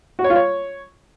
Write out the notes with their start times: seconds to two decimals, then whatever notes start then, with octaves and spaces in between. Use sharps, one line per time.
0.19 F#4
0.24 C#5
0.30 F4
0.36 C#5